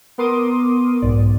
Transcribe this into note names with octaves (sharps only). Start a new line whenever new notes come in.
B3 A#4 C6 D6 D#6 D#7
B1 G#2 D5